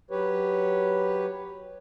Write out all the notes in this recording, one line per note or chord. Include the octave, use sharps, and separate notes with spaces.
F#3 G4 B4 C#5